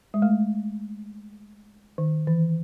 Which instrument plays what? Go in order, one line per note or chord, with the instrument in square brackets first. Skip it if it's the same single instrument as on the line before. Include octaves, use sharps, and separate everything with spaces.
[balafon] G#3
A3
D#3
E3